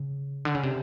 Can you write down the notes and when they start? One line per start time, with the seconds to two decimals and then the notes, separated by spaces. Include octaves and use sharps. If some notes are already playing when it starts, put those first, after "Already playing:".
Already playing: C#3
0.45 D3
0.55 C#3
0.63 C3